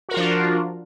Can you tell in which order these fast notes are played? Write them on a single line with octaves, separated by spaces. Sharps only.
F#4 A#4 F4 F3 D4